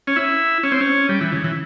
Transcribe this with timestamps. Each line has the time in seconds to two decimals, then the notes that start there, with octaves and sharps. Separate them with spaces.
0.07 C#4
0.16 E4
0.63 C#4
0.72 C4
0.81 C#4
1.09 G3
1.21 E3
1.32 C#3
1.44 E3